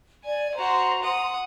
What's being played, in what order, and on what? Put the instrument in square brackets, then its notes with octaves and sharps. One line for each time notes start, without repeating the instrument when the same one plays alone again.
[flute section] D5 [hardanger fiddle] G#5
[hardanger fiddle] F#4 C5 [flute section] A#5 C6
[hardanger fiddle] F#5 D#6